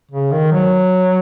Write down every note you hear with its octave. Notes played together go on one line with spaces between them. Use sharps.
C#3
D#3
F#3